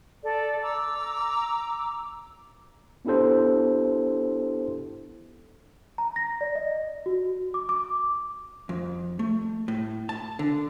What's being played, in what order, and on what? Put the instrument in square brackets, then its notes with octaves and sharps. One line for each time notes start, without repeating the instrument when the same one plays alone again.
[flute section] A4 D5
A#5 D6 E6
[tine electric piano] B3 D4 E4 G4 A4 C5
[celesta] A#5
A#6
D5
D#5
F#4
D6
D6
[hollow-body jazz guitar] F2
A3
A2
A5
D3